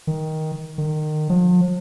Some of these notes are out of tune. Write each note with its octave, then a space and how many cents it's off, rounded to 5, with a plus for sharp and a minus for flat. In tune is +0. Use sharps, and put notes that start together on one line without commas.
D#3 +10
D#3 -25
F3 +45